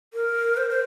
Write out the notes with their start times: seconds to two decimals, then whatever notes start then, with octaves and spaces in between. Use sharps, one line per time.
0.14 A#4
0.57 C5
0.70 C5